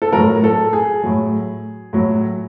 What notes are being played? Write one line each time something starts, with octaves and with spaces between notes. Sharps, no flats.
A4
A2 F#3 A#4
A4
G#4
A2 F#3
A2 F#3